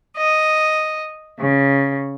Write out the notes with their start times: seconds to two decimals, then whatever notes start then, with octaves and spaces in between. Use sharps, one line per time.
0.16 D#5
1.37 C#3